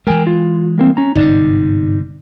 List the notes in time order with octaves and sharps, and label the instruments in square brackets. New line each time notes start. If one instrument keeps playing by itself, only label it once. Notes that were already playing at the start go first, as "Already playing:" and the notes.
[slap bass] E3 G#3 [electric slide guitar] A#4 G5 G#5
[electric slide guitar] F4
G3 A#3 C4
C#4 A#5
[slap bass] G1 G#2 C3 [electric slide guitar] D#4 D5